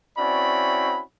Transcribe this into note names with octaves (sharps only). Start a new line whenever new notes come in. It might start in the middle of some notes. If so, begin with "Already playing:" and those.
C4 C#4 E4 F#4 D5 B5